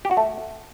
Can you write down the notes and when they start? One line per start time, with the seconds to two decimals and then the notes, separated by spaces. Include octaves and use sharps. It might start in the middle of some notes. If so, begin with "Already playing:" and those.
0.05 G4
0.11 F#4
0.17 A3